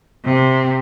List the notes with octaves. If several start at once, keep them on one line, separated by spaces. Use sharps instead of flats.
C3